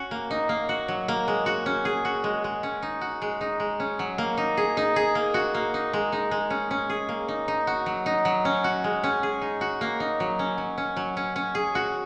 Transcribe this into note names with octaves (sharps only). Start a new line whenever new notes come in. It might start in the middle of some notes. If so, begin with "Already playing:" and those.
Already playing: C#4 F#4
A#3
D#4
A#3
F#4
F#3
A#3
G#3
F#4
C#4
G#4
F#4
G#3
G#3
C#4
D#4
F#4
G#3
D#4
G#3
C#4
F#3
A#3
D#4
G#4
D#4
G#4
A#3
F#4
A#3
D#4
G#3
D#4
G#3
C#4
C#4
G#4
A#3
D#4
D#4
F#4
F#3
D#4
F#3
C#4
F#4
G#3
C#4
G#4
D#4
F#4
A#3
D#4
F#3
C#4
F#3
C#4
F#3
C#4
C#4
G#4
F#4